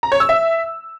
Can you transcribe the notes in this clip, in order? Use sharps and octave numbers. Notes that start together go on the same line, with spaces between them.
A#5
C#5
E6
E5